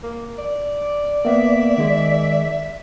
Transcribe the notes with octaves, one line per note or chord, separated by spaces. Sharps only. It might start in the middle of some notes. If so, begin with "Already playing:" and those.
A#3
D5
A#3 B3 E5
D#3 G#3